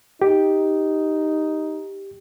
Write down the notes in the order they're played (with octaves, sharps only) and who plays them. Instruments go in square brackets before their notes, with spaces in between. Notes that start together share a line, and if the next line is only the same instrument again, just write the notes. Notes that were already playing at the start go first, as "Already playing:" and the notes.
[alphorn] D#4 [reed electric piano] G4